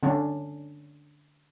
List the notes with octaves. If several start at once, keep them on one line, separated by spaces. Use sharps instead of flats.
D3 C#4 D4